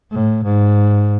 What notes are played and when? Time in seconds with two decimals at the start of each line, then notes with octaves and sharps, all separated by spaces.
0.12 A2
0.44 G#2